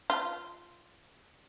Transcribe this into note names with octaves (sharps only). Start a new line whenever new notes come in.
F4